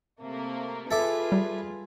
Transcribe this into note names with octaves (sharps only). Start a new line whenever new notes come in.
C3 A3 A#3
F4 G#4 A4 B4 E5 D6
G3